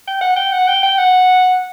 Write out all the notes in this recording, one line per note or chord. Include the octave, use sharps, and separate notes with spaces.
G5
F#5
G5
F#5
G5
G5
F#5